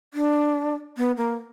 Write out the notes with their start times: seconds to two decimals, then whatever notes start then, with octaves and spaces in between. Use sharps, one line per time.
0.14 D4
0.97 B3
1.17 A#3